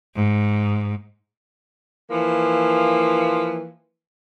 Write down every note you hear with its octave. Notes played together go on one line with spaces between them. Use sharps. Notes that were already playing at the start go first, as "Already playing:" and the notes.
G#2
E3 F3 A#3